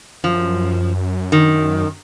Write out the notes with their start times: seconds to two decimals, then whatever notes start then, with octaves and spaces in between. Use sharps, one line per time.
0.24 F#2 F3
1.32 D#3